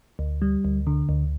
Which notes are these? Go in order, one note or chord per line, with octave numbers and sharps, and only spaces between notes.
D2
G3
D2
D3
D2